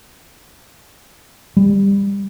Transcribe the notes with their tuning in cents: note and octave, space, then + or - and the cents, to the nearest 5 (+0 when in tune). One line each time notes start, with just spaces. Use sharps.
G3 +25